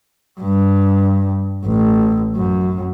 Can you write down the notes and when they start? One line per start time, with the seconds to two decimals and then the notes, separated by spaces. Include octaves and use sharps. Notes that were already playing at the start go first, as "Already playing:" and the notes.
0.41 G2
1.66 A1
2.36 F#2